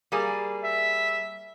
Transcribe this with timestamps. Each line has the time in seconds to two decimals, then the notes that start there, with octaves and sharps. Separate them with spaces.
0.12 G3 A#3 G#4
0.64 E5